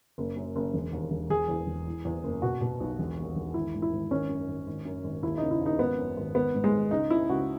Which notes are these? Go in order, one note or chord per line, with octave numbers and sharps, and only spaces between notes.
F#1
F#2
F#1
E1
D#2
E1
E1 G#4
E2
E1
E3
E2
F#1
B2 F#4
B2
B1
E1
D#2
E1
G#1 E4
G#2
E4
G#1
G#1 C#4
F#2
G#1
G#1
F#2
G#1
D#2 E4
C#3 D#4
E4
D#2
D#4
G#1 B3
F#2
G#1
G#1 B3
G#2
G#3
G#1
C#2 D#4
C#3 E4
C#2 F#4